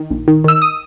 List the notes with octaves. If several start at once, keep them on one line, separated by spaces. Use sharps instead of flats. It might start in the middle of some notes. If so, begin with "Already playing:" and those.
Already playing: D#3
A#1
D#3
D#3 E6
D#6